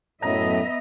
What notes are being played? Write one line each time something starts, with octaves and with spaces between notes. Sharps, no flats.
F#2 A2 B3 D#5 E5 A#5